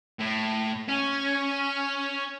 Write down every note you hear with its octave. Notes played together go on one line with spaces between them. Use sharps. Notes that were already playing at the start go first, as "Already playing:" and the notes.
A2
C#4